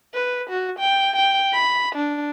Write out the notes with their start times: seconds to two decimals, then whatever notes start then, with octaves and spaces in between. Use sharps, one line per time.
0.14 B4
0.50 F#4
0.79 G5
1.16 G5
1.53 B5
1.95 D4